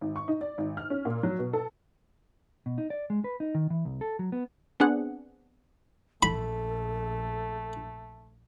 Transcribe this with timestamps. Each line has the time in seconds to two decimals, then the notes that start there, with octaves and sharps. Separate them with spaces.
0.01 G#1
0.16 C#6
0.28 D#4
0.41 D5
0.58 G#1
0.77 F6
0.90 C#4
1.05 A#2
1.23 F#3
1.39 B2
1.53 A4
2.66 B2
2.78 D#4
2.90 D5
3.10 G#3
3.24 B4
3.40 D#4
3.55 D#3
3.70 E3
3.85 C2
4.01 A4
4.19 F#3
4.32 B3
4.80 B3 C4 D4 G#4 F#5
6.23 A#1 A3 A4 B5